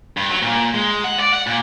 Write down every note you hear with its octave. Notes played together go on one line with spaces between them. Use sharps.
G2
F#3
A#2
G#3
F#5
D5
F#5
A#2